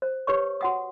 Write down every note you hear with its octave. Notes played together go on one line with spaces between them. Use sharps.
C5
G4 B4 C#5 C#6
F#4 F#5 D#6